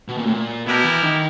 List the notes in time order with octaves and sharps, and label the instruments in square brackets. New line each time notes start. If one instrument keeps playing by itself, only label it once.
[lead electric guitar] B2
A#2
A2
A#2
[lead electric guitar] B2 [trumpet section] B3 E4 G4 A#4
[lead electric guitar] E3
D#3